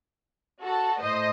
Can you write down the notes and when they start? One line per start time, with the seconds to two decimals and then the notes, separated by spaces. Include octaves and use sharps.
0.62 F#4 A4
1.00 A2 C5 D#5